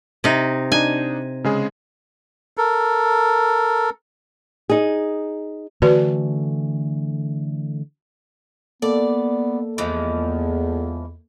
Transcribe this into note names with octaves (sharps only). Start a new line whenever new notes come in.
C3 D#4
D4 D#4 G#5
C#3 G#3 G#4
A4 A#4
D#4 G#4
D3 E3 A3 F#4 B4 D5
A#3 B3 A4 D5
E2 E3 F3 G#3